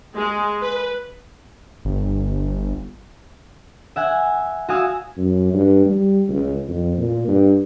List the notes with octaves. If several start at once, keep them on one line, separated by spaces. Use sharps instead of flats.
G#3
B4
G1
E5 F#5 G#5
F#4 F5 G#5 D#6 E6
F#2
G2
G3
C#2
F2
A#2
G2